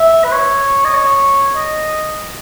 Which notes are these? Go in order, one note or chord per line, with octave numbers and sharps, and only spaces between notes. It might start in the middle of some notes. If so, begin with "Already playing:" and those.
Already playing: E5
B4
C#5
D#5
C#5
D#5